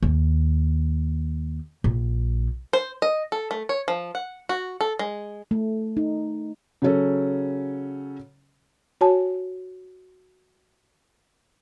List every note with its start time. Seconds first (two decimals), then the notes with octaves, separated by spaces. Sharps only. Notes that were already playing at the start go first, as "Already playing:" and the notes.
0.03 D#2
1.84 A#1
2.73 C5
3.02 D#5
3.32 A4
3.51 A3
3.69 C#5
3.88 F3
4.15 F#5
4.49 F#4
4.81 A4
4.99 G#3
5.51 A3
5.97 D#4
6.82 C#3 F#3 C#4 A4
9.01 F#4 C#5 G#5 A5